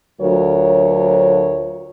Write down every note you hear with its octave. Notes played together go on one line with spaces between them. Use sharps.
D2 F#3 F4 A4 A#4 C#5